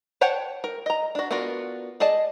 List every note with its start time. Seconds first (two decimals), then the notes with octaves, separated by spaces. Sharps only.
0.21 C5 C#5 F#5 G5 A5
0.64 A#4
0.86 D#5 A#5
1.15 D4 F#4
1.31 B3 D4 F4 F#4 A#4
2.00 G#4 D5 D#5 A5